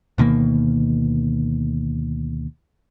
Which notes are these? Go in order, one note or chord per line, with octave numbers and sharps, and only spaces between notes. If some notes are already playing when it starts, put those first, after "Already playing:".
D2 B2 D#3 A#3